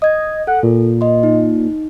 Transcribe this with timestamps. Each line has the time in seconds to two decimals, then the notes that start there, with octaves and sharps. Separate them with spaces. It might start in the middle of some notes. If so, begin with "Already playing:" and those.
0.02 D#5 D#6 G#6
0.47 A4 F#5
0.63 A#2
1.01 D#5 C6
1.23 D#4